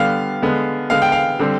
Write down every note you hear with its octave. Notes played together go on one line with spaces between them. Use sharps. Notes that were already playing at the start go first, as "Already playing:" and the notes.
Already playing: D3 G3 B3 F5
D3 G#3 B3
D3 G#3 B3 F5
G5
F5
D3 G3 C4